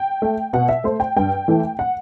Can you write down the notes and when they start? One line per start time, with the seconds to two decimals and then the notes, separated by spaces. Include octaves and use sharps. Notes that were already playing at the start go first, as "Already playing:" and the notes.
Already playing: G5
0.22 A3
0.53 B2 F#5
0.69 E5
0.84 A3 C5
1.00 G5
1.17 G2 G5
1.48 E3 A3
1.79 F#5